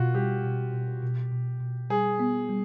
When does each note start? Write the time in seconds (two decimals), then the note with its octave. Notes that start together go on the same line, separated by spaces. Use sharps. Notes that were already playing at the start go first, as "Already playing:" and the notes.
Already playing: B2 F4 F#4
0.14 G3 G4
0.44 B2
0.73 B2
1.03 B2
1.32 B2
1.61 B2
1.90 G3 G#4
2.20 B3
2.49 G3